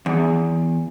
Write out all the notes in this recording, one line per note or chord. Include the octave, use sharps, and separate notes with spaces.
E2